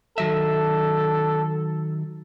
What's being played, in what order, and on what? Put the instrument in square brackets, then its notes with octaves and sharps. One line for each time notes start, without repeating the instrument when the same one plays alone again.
[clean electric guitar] D#3 F#3 E5 [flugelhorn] A4